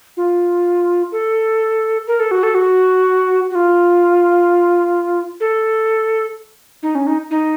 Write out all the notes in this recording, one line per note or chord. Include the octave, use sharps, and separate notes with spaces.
F4
A4
A#4
A4
F#4
A4
F#4
F#4
F4
A4
D#4
C#4
D#4
D#4